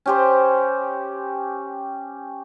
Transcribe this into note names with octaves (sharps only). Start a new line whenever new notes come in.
C#4 G4 C5